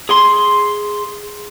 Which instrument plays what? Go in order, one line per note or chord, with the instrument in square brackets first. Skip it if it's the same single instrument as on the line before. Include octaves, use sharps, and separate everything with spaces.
[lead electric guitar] G#4 C6